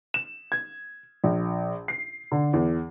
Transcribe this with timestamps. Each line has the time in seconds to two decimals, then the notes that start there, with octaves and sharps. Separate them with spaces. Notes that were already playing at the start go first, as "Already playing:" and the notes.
0.14 E7
0.52 G#6
1.24 A#1
1.88 C7
2.32 D3
2.53 E2